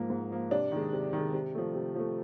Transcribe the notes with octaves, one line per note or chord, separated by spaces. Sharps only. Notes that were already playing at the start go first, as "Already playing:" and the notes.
Already playing: G#2 F3 A#3
G#2
F3 A#3
C3 D4
D#3 G#3
C3
D#3 G#3
C3
F3 A3
C3
F3 A3